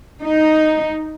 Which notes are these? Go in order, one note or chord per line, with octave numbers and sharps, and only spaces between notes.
D#4